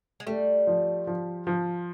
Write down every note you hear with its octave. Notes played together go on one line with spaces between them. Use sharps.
G#3
G3 A3
F3
F3
F3